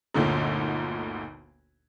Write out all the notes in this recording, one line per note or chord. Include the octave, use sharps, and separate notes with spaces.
G1 D2 A#2 D3 D#4